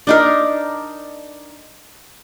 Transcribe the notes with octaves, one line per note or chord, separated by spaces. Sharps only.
D4 D#4 A#4